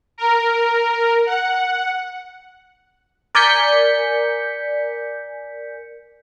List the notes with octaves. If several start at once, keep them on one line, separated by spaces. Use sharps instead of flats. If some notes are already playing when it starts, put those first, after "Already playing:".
A#4
F#5
A#4 D5 G#5 G6 B6 C#7